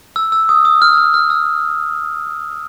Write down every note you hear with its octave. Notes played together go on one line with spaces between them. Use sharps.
E6
E6
D#6
D#6
F6
E6
F6
F6
E6